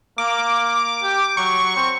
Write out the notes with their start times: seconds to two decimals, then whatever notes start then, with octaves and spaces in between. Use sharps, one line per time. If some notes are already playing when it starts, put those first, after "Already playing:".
0.18 A#3 D6
1.03 G4
1.37 F#3 C#6
1.76 C4